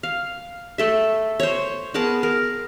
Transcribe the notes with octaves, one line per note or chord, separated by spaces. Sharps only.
F5
A3 A4 E5
C5 C#5
B3 G#4 A#4 A5
A#4